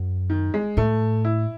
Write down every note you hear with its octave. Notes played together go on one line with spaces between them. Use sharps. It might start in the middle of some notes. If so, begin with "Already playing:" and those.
Already playing: F#2
D#3
G#3
A2 A3
E4